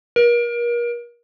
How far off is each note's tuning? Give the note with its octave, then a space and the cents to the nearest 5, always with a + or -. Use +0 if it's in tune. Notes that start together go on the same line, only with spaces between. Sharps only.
A#4 +35